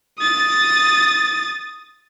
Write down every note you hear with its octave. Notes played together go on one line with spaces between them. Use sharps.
D#6 A6